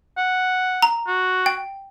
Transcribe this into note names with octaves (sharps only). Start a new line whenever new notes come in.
F#5
A#5
F#4
G5